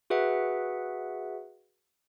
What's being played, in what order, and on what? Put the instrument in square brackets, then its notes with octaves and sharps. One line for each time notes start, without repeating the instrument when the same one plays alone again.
[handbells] F#4 G#4 B4 E5 F#5